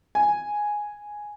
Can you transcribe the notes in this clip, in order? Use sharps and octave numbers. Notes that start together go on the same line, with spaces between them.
G#5